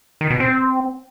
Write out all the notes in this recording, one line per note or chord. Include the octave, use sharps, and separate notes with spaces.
D#3
B2
C4